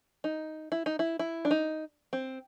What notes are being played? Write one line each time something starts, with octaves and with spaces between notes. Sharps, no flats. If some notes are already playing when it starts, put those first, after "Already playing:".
D#4
E4
D#4
E4
E4
D4
D#4
C4